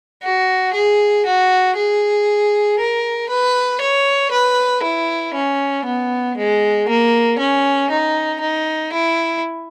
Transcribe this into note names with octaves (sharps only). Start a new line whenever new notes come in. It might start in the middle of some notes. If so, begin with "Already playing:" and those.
F#4
G#4
F#4
G#4
A#4
B4
C#5
B4
E4
C#4
B3
G#3
A#3
C#4
D#4
D#4
E4